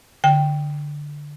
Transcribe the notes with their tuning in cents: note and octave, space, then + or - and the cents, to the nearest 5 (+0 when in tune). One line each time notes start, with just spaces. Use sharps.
D3 +0 G5 +0